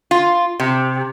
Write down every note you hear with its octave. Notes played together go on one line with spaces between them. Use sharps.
F4
C3